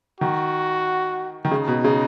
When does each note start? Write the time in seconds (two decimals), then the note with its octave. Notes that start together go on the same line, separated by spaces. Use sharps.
0.21 D#3 F#4
1.45 D#3
1.51 C#3 D#4
1.68 B2
1.84 C#3